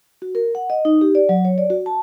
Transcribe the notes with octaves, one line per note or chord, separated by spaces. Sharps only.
F#4
A#4
F#5
D#5
D#4
G4
D5
F#3
C#5
D5
F#4
A5